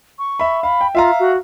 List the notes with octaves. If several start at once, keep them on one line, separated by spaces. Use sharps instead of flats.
C#6
E5 B5
F5 B5
G5
F4 E5 F5 A#5
F#4